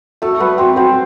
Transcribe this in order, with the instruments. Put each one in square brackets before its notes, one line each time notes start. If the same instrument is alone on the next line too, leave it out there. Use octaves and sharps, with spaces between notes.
[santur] A3 A4 [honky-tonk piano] F#4
[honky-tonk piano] F#3 [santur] B3 B4
[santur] C4 C5 [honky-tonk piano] F#4
[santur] C4 C5 [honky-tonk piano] F#4